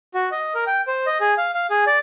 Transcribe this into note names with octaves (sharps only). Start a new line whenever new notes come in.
F#4
D#5
A#4
G5
C5
D#5
G#4
F5
F5
G#4
D5